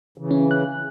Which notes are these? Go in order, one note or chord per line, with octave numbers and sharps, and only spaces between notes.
C#3 E3
C#4
F#6